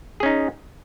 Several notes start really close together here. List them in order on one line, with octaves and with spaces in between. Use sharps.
G#4 C#4 D#4